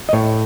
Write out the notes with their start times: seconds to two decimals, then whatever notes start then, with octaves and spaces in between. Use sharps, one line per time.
0.09 D#5
0.13 A2 C#5